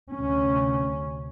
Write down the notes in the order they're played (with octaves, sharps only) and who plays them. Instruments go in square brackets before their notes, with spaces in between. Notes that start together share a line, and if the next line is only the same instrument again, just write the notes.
[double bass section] D2 C3 C#4